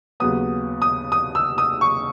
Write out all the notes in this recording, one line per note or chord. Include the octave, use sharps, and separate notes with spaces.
D#2 C#3 F#3 B3 D#6
D#6
D#6
E6
D#6
C#6